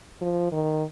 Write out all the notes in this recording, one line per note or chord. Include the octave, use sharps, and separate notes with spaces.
F3
D#3